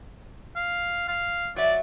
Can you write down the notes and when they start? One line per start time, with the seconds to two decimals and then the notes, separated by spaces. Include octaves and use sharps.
0.56 F5
1.08 F5
1.56 F#3 D5 E5